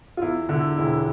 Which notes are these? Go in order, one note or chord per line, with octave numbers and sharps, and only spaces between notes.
F4
E2 E4
D3 E4
E1 E4